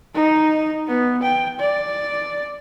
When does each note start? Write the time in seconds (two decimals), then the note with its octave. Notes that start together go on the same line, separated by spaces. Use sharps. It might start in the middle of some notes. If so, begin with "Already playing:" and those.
0.14 D#4
0.87 B3
1.23 G5
1.59 D5